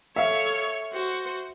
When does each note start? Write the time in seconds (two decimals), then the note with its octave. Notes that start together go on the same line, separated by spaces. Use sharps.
0.16 A4 C#5 E5 F5
0.93 F#4 C5